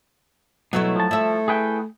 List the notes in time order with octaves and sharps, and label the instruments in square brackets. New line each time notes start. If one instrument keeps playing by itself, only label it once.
[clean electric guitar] B2 [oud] F#3 A3 E4
[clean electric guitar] F3 A5
[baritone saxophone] A3 [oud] E4 E5
[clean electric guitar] G#4 B4 G5